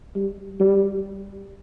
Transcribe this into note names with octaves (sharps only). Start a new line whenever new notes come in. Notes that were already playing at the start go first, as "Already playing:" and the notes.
G3
G3